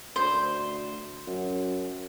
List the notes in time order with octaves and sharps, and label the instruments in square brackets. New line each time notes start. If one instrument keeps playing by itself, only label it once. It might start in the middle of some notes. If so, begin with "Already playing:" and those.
[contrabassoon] D2 [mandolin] C5
[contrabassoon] F#2